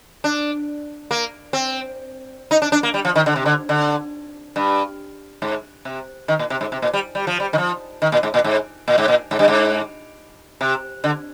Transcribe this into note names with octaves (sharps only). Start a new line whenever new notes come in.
D4
A#3
C4
D#4
D4
D4
A#3
G3
F3
D#3
D3
C3
D3
D3
G2
G#2
C3
D#3
A#2
C3
G#2
C3
A#2
G3
G3
F3
G3
D#3
F3
D#3
A#2
G#2
A#2
G#2
A#2
G#2
A#2
G#2
G2
G#2
C3
D3